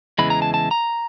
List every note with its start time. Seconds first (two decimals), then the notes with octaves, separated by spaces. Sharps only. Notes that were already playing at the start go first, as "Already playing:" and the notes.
0.18 E2 C#3 E3 G#3 B5
0.30 A#5
0.42 A5
0.54 A5
0.71 A#5